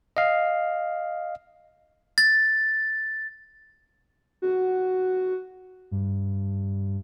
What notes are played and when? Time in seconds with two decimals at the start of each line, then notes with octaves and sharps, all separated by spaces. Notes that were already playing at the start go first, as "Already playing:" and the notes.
0.17 D#5 F5
2.18 A6
4.42 F#4
5.91 G2